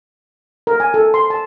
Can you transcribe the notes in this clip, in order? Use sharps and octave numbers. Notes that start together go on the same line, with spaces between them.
A#4
G#5
A4
C6
A5